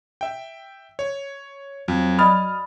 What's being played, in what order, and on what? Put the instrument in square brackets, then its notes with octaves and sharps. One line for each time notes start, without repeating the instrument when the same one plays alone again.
[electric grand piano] E5 G5
C#5
[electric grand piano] F2 [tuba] F#3
[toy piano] D5 D#5 B5 [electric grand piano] D#6 F6 A6